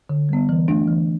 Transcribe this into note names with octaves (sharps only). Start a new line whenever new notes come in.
D3
G3 B3
E3
A3 D4
E3